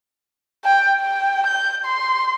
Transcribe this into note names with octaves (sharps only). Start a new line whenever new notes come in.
G5
G5
G6
C6